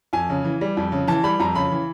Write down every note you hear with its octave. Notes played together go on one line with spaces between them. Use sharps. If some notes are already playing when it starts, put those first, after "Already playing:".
F2 G#5
C#3
E3
G3
F2
C#3
E3 A5
G3 B5
F2 A#5
C#3 B5
E3